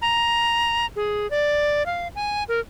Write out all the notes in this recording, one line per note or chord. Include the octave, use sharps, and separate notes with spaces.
A#5
G#4
D5
F5
G#5
A#4